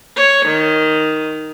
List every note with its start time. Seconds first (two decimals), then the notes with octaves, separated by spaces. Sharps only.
0.16 C#5
0.46 D#3